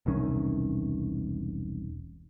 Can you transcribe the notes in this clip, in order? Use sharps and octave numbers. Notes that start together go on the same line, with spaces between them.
E1 C2 D#3 C#4